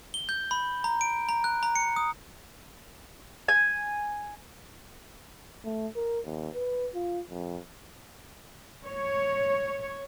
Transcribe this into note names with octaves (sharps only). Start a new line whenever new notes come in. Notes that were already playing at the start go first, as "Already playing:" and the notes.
G7
G6
B5
A#5
D7
A#5
F#6
A#5
C#7
D#6
G#5
A3
A#4
D#2
B4
F4
F2
C#5